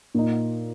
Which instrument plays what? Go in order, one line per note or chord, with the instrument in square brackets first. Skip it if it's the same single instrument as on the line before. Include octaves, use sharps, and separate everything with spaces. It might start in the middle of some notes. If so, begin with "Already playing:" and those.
[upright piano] A#2 A#3 D#4